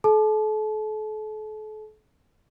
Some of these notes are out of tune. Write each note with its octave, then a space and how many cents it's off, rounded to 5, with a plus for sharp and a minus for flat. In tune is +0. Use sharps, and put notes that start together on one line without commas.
A4 -40 A5 -30